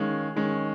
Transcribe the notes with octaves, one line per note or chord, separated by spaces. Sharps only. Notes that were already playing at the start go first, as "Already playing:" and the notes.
Already playing: D#3 G#3 C#4 F5
D#3 G#3 C#4